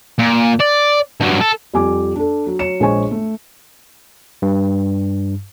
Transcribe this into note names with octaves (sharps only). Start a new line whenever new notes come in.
A#2
D5
G2 F#3
A4
F2 G3 G#5 D6
D4 A4
F#3
F#3 C#5 C#7 E7
A#1 G#3 C5 C#5 G#5 C#6
A3
G2